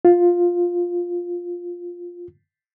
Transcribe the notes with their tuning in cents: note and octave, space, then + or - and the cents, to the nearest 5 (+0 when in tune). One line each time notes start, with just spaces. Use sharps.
F4 +5